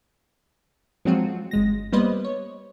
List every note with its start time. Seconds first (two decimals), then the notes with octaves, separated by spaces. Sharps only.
1.05 F3 F#3 G#3 C4 F4 F#4
1.51 G1 G#3 A#6
1.93 G3 A#3 B3 B4 C5 D#5
2.25 C#5